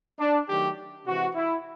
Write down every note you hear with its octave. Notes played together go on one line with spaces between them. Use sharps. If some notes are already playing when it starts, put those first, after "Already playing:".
D4
D#3 F#3 A3 G4
C3 E3 G#3 F#4
E4